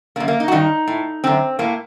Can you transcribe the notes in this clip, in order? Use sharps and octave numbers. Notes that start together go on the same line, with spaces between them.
F#2 D3 A#3
A#3
D#4
F#4
G2 D#3 D#4
A2
F#2 D3 C4
A2 A#3